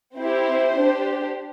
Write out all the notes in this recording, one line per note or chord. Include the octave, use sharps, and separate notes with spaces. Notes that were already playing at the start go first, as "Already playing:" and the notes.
C4 E4 G4 C5
D4 G4